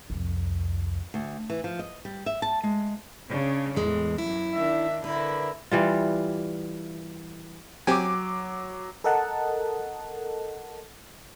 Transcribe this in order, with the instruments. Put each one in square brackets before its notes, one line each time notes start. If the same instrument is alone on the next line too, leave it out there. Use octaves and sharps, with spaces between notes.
[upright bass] C2 F2
[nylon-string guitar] D2
E3
F3
D#5
G3
E5
A5
G#3
[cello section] C#3 D4
[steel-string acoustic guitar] E2 G#3 [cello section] A2 E3
[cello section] F#2 [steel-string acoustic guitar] E4
[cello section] D#3 D4 [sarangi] E5
[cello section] D3 A#4 [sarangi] E4 [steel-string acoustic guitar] B4
[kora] E3 G3 F4
[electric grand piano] F#3 D6 [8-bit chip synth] C4 G4 G#5
[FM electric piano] A4 A#4 D#5 F#5 A5